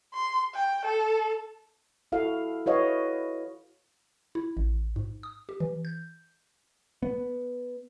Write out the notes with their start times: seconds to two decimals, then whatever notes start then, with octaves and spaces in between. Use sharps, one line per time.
0.14 C6
0.54 G5
0.86 A4
2.12 E4 F#4 A4 F5
2.66 E4 F#4 B4 C#5 D#5 F5
4.35 E4
4.57 A1
4.96 G#2
5.23 D#6
5.49 G4
5.60 E3
5.85 G6
7.03 B3